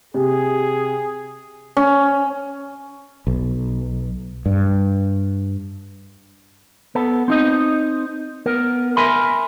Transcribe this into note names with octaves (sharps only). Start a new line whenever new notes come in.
C3 G#4
C#4
B1
G2
B3 A4
C4 D#4 D#5
B3 A#4
A#4 E5 G#5 B5 C6